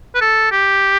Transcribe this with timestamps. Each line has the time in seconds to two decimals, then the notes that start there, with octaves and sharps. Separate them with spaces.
0.15 B4
0.21 A4
0.52 G4